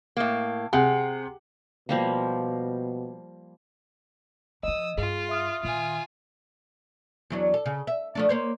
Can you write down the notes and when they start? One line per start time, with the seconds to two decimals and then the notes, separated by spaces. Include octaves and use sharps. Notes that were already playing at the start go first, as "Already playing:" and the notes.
0.17 A2 A#3
0.73 C3 G#4 F#5
1.89 B2 F3 G3 A#3
4.63 F3 F#3 D#5 D#6 E6
4.98 G2 F4 G#4
5.29 E5 D#6 F6
5.63 A#2 D#3 F4 G#5
7.30 E2 F#3 D4
7.54 A4
7.66 C#3
7.87 E5
8.15 F3 A3 D4
8.29 A#3 C5 C#5